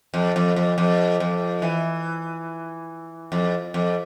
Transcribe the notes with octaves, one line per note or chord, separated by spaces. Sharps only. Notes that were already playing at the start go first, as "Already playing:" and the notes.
F2
F2
F2
F2
F2
E3
F2
F2